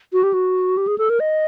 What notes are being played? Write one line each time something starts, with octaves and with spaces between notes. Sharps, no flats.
F#4
G4
F#4
G4
G#4
A4
A#4
D#5